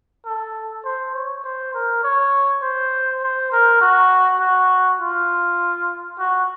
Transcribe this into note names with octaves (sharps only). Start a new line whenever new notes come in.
A4
C5
C#5
C5
A#4
C#5
C5
C5
A#4
F#4
F#4
F4
F#4